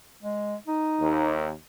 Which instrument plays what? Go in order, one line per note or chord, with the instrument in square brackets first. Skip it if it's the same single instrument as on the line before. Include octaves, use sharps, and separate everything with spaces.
[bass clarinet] G#3
D#4
[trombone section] D#2